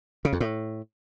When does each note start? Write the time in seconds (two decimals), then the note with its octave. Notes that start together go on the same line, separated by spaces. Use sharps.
0.25 C#3
0.33 F2
0.40 A2